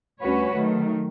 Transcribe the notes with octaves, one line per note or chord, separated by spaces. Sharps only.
D2 G3 C#4 F#4 B4 C#5
D#3 F#3 A3